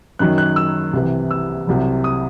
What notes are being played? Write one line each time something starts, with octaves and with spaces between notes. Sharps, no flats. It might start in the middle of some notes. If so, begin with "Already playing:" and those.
F#2 D#3 F#3 F#6
F#6
E6
C2 C3 E3
E6
C2 C3 F#3
D#6